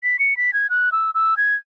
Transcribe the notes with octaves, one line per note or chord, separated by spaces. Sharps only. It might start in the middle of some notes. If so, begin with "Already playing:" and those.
B6
C#7
B6
G#6
F#6
E6
E6
G#6